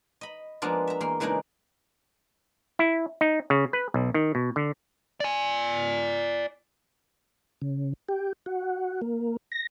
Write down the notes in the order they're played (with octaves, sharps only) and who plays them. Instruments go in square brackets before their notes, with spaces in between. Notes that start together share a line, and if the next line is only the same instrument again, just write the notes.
[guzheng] D#5 B5
F3 G#3 A#3 B3 D4 F4
E5 A#5
E2 A#3 C6
C#3 E3 G#3 A#3 D4 D#4
[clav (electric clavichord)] E4
D#4
C#3
B4
B1
D#3
B2
D3
[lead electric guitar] D5 G#5
[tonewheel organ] C#3
G4
F#4
A#3
A#6